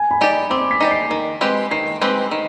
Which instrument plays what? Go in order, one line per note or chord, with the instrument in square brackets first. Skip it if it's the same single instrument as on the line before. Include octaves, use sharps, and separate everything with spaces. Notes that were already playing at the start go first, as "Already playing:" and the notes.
Already playing: [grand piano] G#5
B5
[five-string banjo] D#4 G4 D5
[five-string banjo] C4 [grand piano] D6
[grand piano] B6
[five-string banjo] D#4 G4 D5
[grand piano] C7
[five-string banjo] D#3
G#3 C4 G4 B4
[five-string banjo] D#3 [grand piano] C7
[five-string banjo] G#3 C4 G4 B4
D#3